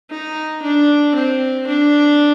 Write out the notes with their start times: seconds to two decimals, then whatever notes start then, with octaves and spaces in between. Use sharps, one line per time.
0.10 D#4
0.62 D4
1.15 C4
1.67 D4